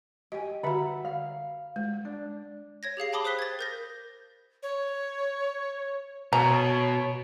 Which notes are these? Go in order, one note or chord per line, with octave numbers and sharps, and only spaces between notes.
G4 D#5 G#5
D3 F#4 E5 F#5 B5
F5
G#3
D4
C#5 G#6 A#6
G4 G#4 F5 C7
G5 A5 B5 D6 D#6 G7
C5 D#6 F#6 B6 G7
G#6 A6
A#4 G6 A#6
C#5
B2 C#5 A#5